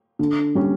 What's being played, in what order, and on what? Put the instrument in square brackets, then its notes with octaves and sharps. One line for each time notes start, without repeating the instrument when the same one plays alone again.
[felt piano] D3
G3 C#4